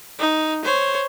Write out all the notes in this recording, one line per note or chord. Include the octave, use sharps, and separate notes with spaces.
D#4
C5 C#5